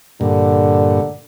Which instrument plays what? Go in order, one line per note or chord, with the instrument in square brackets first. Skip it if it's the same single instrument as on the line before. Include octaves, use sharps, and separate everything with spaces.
[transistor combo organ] G2 A#2 [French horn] D3